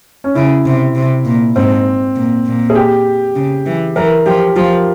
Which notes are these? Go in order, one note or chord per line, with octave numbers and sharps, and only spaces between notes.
C#4
C#3 E4
C3
C3
A#2
G#2 C4
A#2
A#2
G#4
G4
C#3
E3
E3 A#4
F3 G4
F3 F4